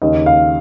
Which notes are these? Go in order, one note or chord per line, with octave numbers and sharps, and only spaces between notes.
D#2 C#3 D#5
F5